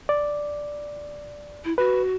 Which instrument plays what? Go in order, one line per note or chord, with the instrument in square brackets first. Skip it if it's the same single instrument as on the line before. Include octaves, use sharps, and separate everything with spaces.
[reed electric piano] D5
[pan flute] E4
[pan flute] F#4 [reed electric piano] B4